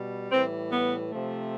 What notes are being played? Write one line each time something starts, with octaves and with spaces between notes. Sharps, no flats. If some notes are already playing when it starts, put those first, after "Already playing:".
Already playing: B2 G3
A2 E3 G3 C4
B3
C3 F3 A3